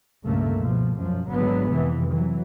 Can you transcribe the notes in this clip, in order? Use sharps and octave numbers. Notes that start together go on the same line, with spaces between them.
C#2 G2 A#2 C#3 A3 A#3
B2 F3
F#2 B2 F3
G#1 D3 F#3 G#3 B3
F2 C3 E3
E3 F#3